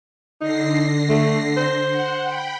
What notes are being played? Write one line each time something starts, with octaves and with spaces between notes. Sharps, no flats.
D3 D#4 A#6 C7
A3
C5
F#5
G5 B5